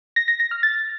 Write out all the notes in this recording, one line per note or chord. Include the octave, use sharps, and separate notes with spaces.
A#6
A#6
A#6
F6
A6